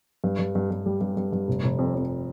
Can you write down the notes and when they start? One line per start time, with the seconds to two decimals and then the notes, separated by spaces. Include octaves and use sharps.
0.24 G2
0.39 G2
0.55 G2
0.71 G2
0.86 G3
1.01 G2
1.17 G2
1.32 G2
1.48 F1
1.64 F1
1.79 F2
1.95 F2